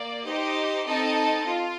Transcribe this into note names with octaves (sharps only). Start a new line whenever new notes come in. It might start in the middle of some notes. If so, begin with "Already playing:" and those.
Already playing: A#3 D5
D#4 G4 C5 D#5
C4 D#4 A4 D#5 A5
F4